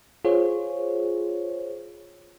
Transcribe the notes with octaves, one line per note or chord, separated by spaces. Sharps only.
F4 G#4 C5 C#5